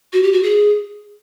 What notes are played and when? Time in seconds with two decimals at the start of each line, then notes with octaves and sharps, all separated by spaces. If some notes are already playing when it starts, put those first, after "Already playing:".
0.13 F#4
0.23 G4
0.33 F#4
0.43 G#4